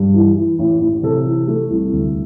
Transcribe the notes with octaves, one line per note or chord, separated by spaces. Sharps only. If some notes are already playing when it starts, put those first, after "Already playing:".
Already playing: G2
E3
E3
A1
A1
C3 A4
E3
A3
C2
D2